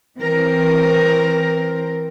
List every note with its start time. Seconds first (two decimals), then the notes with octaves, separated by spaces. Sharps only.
0.17 E3 C4 A#4